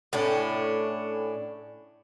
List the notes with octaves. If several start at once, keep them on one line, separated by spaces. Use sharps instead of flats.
A2 C#4 D4